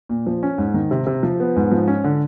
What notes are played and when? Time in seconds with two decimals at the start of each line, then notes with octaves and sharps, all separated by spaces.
0.09 A#2
0.27 F3
0.43 C#4
0.58 G#2
0.74 D#3
0.91 C3
1.07 C3
1.23 F3
1.40 B3
1.56 G#2
1.71 F3
1.88 C#4
2.04 D3